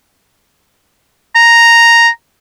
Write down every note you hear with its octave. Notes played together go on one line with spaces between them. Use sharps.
A#5